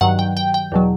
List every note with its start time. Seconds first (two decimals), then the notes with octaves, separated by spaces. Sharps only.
0.01 G2 D#3 F#3 F#5
0.19 G5
0.37 G5
0.54 G5
0.72 E2 B2 F#3